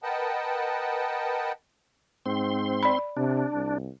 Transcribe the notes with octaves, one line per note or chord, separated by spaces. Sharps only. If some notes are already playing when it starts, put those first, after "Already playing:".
A#4 B4 D#5 F#5 G5 A5
G#2 C4 C6
D5 B5
C3 D4
C2